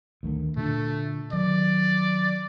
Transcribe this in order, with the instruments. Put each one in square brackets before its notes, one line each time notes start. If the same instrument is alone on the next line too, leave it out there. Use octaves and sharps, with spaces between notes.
[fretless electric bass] D2 D#3 A3
[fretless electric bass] A#2 D3 D4 [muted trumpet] A3
[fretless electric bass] D#3 F#3 [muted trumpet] D5